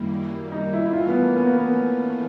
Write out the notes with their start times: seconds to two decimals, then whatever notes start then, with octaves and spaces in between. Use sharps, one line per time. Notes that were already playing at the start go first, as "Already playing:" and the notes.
Already playing: F#2 D#3 G3 A#3 E4
0.52 D#4
0.73 E4
0.86 E4
0.93 E3 A3 C#4 F4
1.08 B3
1.22 A#3
1.36 B3
1.46 A#3
1.57 B3